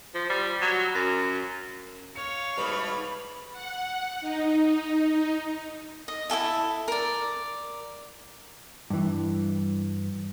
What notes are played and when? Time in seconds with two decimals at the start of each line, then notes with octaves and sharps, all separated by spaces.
0.15 F3
0.30 G3
0.62 F#3
0.95 F#2
2.15 C#5 F5 C#7
2.58 G#2 B2 G3 B4 B5
3.52 F#5
4.21 D#4
6.08 D#5
6.30 E4 G4 A4 E5
6.88 A#4 D5
8.90 G2 E3